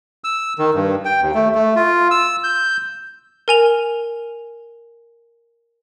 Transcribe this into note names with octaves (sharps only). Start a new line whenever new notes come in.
E6
D#3
G2
G5
D#2
A3
A3
F4
E6
G6
A#4 G#5 F7